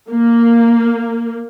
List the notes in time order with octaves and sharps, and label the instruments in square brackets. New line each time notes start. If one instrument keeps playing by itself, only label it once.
[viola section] A#3